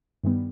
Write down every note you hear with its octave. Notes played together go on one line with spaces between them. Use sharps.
G2 D#3 G3 B3